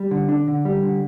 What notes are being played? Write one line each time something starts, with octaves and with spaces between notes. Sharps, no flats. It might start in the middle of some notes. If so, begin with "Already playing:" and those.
Already playing: G3
D3
D4
D3
G3
D3